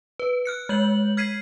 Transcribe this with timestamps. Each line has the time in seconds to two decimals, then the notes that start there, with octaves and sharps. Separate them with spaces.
0.20 B4
0.45 F6 F#6 C#7
0.69 G#3 G6 F#7
1.17 F6 G#6 B6 C7 D#7